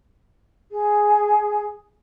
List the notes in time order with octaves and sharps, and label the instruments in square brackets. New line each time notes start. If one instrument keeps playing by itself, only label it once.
[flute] G#4